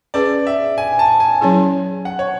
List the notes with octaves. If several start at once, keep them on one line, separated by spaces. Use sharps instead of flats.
C#4 G#4 B4 D5
E5
G#5
A5
G#5
F#3 C#4 E4 G#4
F#5
C#5